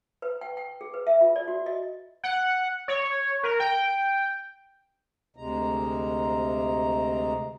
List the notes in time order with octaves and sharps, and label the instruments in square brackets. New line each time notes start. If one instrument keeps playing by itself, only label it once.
[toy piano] B4
G5
G5
G#4
B4
E5
F4
D5
F#4
D#5
[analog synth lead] F#5
C#5
A#4
G5
[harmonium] D2 C3 G#3 A#5